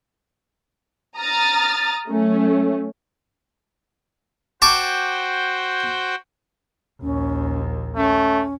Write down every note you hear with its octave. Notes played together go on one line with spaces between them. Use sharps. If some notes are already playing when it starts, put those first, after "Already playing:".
A#5 D#6 F6 A6
F#3 A3 C#4
F#4 C5 G5 A5 C#6 D6
A#1 D#2 C#4
A3 C#4